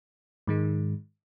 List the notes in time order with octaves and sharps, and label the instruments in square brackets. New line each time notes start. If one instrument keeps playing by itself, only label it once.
[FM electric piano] G#2 D#3 G#3